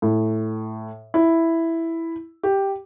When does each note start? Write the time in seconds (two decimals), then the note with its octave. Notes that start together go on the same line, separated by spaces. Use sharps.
0.02 A2
1.14 E4
2.43 G4